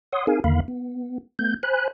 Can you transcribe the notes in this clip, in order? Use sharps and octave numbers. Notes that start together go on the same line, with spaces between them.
C#5 F#5 C6 D#6
C4 D#4 G#4 A#4 F5 G#5
E2 D3 D#3 A#3 F5 B5
B3
A3 B3 G6
C5 G#5 B5 F#6